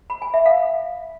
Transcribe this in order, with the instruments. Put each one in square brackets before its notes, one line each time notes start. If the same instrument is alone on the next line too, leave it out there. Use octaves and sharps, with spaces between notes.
[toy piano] B5
G#5
E5
F5